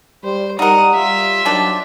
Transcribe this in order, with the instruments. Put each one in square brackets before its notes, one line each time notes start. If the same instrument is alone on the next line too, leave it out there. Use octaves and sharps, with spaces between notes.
[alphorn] G3 [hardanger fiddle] C5
[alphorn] G3 [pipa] D#4 A#4 [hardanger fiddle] F#5 D#6
[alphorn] G3 [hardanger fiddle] F4 E5
[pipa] D#3 F3 D4 [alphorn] F#3